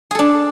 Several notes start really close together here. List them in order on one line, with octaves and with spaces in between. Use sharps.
G#4 A4 D4